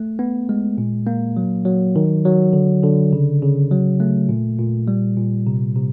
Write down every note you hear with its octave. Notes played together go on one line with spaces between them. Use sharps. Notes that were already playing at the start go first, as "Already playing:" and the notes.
Already playing: A3
B3
G#3
A#2
A#3
F#3
F#3
D#3
F#3
D3
D3
C#3
C#3
F#3
A3
A#2
A#2
G3
A#2
C3
C3